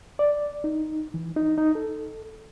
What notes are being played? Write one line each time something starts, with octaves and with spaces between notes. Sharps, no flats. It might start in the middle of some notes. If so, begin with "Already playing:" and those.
D5
D#4
E3
D#4
D#4
A4